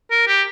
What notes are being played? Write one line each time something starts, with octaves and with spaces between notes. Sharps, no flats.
A#4
G4